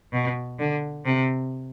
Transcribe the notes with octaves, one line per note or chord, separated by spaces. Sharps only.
B2
D3
C3